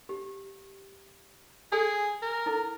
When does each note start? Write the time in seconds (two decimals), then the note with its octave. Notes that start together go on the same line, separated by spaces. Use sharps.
0.09 G4
1.72 G#4 A4 G#5 D#6
2.22 A#4
2.46 E4 A4